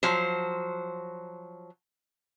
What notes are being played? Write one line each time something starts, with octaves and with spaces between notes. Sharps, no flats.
F3 F#3 C5